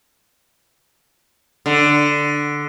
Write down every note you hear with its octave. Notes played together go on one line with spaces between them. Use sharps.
D3